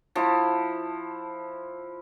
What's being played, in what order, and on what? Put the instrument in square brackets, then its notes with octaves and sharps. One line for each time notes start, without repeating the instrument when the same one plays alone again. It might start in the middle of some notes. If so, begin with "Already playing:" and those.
[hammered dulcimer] F3 E4